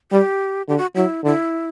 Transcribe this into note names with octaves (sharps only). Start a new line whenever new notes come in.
G3 G4
D3 G4
F#4
F#3 E4
D3 E4